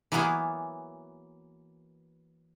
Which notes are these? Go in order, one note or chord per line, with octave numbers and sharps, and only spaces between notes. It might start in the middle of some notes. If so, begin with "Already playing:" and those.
E3 F#3 A#3 B3 E4 G#4